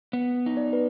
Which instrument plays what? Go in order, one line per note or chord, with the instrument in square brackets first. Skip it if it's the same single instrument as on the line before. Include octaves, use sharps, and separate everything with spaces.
[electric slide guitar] B3
D#4
[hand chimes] D5
B4